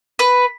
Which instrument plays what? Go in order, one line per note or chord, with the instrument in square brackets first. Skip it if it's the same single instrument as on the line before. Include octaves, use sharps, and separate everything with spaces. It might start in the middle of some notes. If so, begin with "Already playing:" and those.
[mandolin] B4